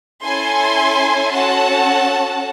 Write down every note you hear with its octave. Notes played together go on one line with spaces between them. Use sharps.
C#4 E4 A4 G#5 C6
C#4 F#4 A4 F#5 A5